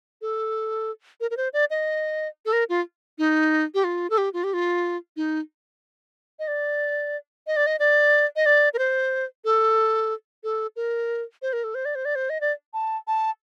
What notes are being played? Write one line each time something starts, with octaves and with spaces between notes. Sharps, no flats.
A4
A#4
A#4
C5
D5
D#5
A4
A#4
F4
D#4
G4
F4
A4
G4
F4
G4
F4
D#4
D#5
D5
D#5
D5
D#5
D5
D#5
D5
A#4
C5
A4
A4
A#4
C5
A#4
A4
C5
D5
C5
D5
C5
D#5
D5
A5
A5